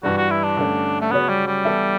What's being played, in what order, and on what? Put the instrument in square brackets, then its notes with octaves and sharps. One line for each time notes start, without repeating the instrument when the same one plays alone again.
[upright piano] G2 E3 G3 [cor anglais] F#4
[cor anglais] F#4
E4
D4
[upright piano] G2 D3 A3 C#4
[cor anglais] A3
[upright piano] C#3 F#3 C#4 F#4 C#5 [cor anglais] B3
[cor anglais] G3
G3
[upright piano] E3 B3 E4 A4 E5